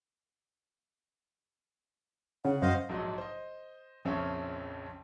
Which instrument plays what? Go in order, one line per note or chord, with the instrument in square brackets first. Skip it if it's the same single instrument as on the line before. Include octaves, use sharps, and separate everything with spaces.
[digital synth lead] C#3 [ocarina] F#5
[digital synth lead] F#2 [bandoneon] C5 D#5 F5
[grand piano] A#1 G#2 F#3 D#5
C5 D#5
A#1 F2 C#3 C#4 C5 E5